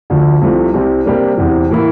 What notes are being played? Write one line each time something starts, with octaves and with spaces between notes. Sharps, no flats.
D2 D3 F3
C2 C3 F3 A3
C2 C3 G3
C3 G3 A#3 D4
E2 C3 E3
A2 E3 A#3 E4